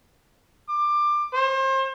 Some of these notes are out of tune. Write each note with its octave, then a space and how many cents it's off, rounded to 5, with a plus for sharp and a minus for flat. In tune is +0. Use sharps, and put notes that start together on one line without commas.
D6 +20
C5 +35